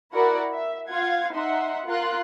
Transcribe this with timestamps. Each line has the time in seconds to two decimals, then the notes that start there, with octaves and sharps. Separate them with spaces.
0.13 E4 F#4 A#4 D5 F#5 B5
0.54 E5
0.89 F4 F5 F#5 G#6
1.34 D#4 E5 F#5 C6
1.86 F4 A#4 C6 F#6